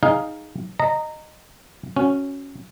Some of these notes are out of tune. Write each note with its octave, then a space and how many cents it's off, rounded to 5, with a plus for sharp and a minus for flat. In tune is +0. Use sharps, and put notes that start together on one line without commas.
D#4 +0 G#4 +0 F5 +0
D#5 -10 A#5 -15
C#4 +0 F#4 +0